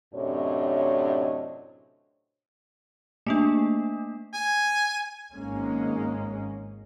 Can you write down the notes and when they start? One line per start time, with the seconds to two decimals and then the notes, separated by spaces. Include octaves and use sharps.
0.14 F#2 A2 C3 D4 C#5 D#5
3.27 A3 A#3 D4
4.33 G#5
5.35 G#1 G#2 G#3 A#3 C#4